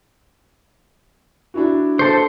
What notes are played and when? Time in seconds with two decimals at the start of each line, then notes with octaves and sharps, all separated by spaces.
1.54 D4 E4 F#4
1.99 A4 C5